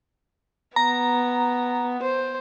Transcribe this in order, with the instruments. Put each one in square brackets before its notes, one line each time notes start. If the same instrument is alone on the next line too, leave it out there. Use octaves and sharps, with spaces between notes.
[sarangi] B3 [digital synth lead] A#5
[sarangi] C5